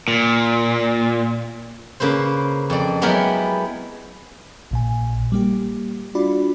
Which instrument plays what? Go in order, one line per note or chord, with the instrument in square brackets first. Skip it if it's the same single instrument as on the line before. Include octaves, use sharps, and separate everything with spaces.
[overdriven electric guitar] A#2
[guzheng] C#3 A#3 B4 C5
F2 D5
F#3 G#3 B3 E4 G4 A#4
[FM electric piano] A#1 A#2 G#5
G3 A#3 G4
D4 F4 F#4 D5 B5 D6